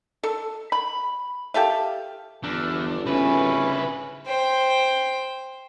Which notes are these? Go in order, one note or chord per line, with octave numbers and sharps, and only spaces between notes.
A4
B5
G4 A4 E5 F5
G1 E2 D4
G#1 C#3 C#4 E4 B4
C5 G5